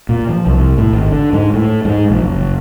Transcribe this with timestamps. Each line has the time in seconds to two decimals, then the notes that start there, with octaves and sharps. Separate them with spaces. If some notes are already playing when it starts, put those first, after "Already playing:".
0.09 A#2
0.29 F3
0.47 C2
0.78 A2
0.93 G#1
1.11 D3
1.33 G#2
1.54 A2
1.85 G#2
2.10 A#1
2.24 F#1